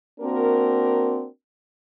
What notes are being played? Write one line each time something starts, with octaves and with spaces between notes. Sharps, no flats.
A#3 C4 D4 F#4 A#4